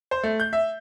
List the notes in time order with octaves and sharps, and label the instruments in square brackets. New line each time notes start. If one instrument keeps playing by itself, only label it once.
[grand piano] C5
A3
G6
E5